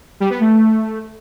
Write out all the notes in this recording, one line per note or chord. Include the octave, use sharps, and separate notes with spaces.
G3
B3
A3